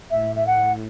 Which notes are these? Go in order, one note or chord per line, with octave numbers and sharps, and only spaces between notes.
A2 E5
E5
F#5